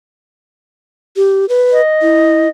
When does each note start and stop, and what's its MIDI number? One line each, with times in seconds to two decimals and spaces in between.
1.16 1.45 67
1.49 1.81 71
1.72 2.49 75
2.02 2.47 64